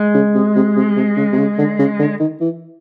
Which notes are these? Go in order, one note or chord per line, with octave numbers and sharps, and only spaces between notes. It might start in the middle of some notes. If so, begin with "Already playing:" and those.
Already playing: G#3
C#3
C3
C3
C3
C3
C#3
C3
C#3
D3
C#3
D3
D#3
E3